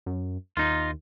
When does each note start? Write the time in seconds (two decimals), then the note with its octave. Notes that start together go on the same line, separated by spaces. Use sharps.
0.06 F#2
0.57 D#2 D#4 F4